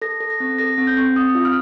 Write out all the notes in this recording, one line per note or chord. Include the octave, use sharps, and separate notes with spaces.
A4 A#6
A4
A#6
C4
A4 A#6
C4
G6
C4
C4 D#6
F4
F6